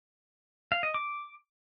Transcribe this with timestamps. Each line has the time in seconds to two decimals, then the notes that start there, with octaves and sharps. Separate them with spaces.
0.72 F5
0.83 D#5
0.94 D6